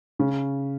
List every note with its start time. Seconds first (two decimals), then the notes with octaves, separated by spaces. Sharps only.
0.19 C#3